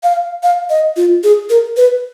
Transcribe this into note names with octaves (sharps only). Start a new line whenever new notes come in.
F5
F5
D#5
F4
G#4
A#4
B4